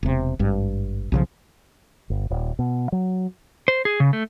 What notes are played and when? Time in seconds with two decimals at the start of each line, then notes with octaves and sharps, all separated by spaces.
0.03 E1 C3
0.39 G#1 G2
1.12 B1 C#3 F3
2.10 G1
2.30 D#1
2.59 B2
2.92 F#3
3.68 C5
3.85 G#4
4.00 C#3
4.13 A3